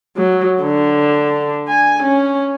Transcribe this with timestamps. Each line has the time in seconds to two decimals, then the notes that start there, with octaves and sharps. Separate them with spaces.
0.16 F#3
0.62 D3
1.69 G#5
2.03 C#4